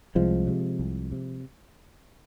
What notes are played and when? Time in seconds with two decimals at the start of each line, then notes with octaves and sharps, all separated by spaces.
0.15 C2 F3 G#3
0.47 C3
0.79 C2
1.12 C3